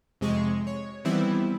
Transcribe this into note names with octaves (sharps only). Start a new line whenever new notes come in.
F2 C3 G#3 G#4 C#6
C#5
D#3 E3 G3 B3 C4 E4